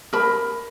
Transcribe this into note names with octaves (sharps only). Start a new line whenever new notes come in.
A#4 B5